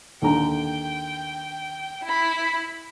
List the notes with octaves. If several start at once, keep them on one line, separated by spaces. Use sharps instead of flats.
D#2 D3 G5 A#5
E4 B5